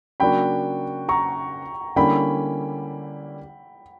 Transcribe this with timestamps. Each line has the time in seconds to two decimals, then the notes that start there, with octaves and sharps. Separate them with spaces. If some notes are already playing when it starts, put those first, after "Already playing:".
0.20 C#3 F#3 A#3 D4 F#4 G5 B5
1.09 A#5 C#6
1.96 D3 G3 A#3 C#4 E4 G5 B5